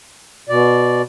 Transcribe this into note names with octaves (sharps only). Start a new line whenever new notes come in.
B2 D5